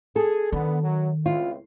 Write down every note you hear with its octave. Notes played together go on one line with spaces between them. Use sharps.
G#4 A4
D3 D#3 B3
F#2 F#3
C#2 C4 E4 F4